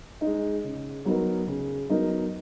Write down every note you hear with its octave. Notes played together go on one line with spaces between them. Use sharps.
D#4
G#3
C#3
F#3 B3 D#4 A#4
C#3
F#3 B3 D#4 A#4